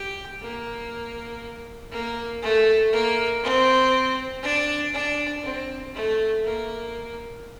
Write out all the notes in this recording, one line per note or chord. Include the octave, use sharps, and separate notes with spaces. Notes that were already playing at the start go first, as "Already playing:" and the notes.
Already playing: G4
A#3
A#3
A3
A#3
C4
D4
D4
C4
A3
A#3